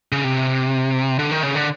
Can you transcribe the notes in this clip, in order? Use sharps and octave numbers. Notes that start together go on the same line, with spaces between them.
C#3
C3
D3
D#3
C#3
D3